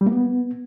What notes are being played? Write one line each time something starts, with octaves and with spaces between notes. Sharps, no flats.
G3
A#3
B3